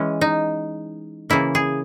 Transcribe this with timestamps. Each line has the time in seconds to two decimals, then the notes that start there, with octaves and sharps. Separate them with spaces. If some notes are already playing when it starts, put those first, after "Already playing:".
Already playing: E3 G#3 C#4
0.21 D#4
1.30 C#3 E3 A#3 E4
1.55 G#4